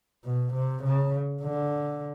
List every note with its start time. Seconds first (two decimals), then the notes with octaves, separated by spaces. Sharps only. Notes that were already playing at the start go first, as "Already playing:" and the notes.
0.25 B2
0.54 C3
0.83 C#3
1.42 D3